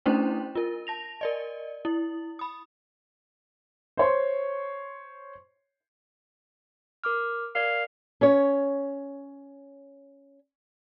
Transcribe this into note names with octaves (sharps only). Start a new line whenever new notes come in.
A3 C#4 D4 E4 C5 G5
F4 A#4
A5 A#6 F7
A#4 D5 D#5
E4
B5 D#6
C5 C#5 C6
A#4 D6 F6
A#4 D5 F5 G#6
C#4 C#5